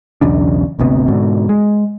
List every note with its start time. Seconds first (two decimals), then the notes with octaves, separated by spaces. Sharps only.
0.21 B1 E2 C#3 D4
0.79 G#1 D2 C3 B3
1.08 G#2 B2 D3
1.49 G#3